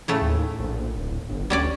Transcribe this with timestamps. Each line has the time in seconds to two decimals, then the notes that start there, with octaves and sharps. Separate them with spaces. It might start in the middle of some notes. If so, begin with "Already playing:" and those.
0.08 A2 C#3 A3
0.22 D#2
0.59 A#1
0.98 D1
1.29 G1
1.50 D2 G3 C#4 D5